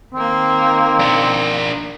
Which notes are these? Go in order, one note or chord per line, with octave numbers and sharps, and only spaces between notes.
D#3 A#3 C4
D4 A#4